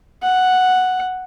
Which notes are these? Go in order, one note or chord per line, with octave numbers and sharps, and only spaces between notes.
F#5